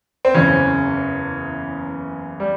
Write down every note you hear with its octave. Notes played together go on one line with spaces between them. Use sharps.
C4
F#1 E2 C#3 C#4
G3